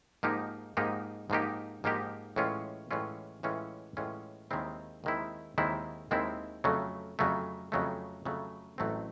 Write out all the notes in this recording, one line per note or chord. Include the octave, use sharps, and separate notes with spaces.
G#2 F3 A#3 D#4 G4
G#2 F3 A#3 D#4 G4
G#2 F3 A#3 D#4 G4
G#2 F3 A#3 D#4 G4
A2 E3 G#3 C#4 F4
A2 E3 G#3 C#4 F4
A2 E3 G#3 C#4 F4
A2 E3 G#3 C#4 F4
D#2 D#3 G#3 C4 E4
D#2 D#3 G#3 C4 E4
D#2 D#3 G#3 C4 E4
D#2 D#3 G#3 C4 E4
F2 C#3 F#3 A3
F2 C#3 F#3 A3
F2 C#3 F#3 A3
F2 C#3 F#3 A3
A1 A2 F#3 A3 C4